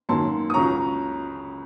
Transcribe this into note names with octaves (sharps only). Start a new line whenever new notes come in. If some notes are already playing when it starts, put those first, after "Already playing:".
F#2 D#3 F#3 A#3 A5 C6
D#6
C#2 C#3 F#3 A#5 C#6